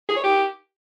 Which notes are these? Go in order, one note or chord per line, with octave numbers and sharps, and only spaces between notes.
G#4
C#5
G4